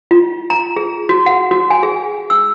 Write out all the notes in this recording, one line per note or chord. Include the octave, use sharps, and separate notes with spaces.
F4
A#5
G#4
F#4
F#5
F#4
G#5
G#4
E6